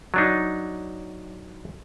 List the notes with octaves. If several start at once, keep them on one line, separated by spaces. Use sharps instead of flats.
F#3 D4 D#4